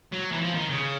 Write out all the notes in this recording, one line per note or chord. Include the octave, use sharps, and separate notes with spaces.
F#3
E3
F3
D#3
C#3